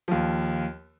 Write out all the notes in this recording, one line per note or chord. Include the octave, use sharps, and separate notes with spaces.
D#2 F3